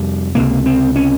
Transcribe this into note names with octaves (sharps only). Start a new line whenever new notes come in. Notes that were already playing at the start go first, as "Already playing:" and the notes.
Already playing: F2 C3 G3
C#2 C3 A#3
C4
C#4